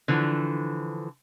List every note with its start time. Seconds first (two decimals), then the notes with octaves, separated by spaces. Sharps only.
0.08 D3 E3 F3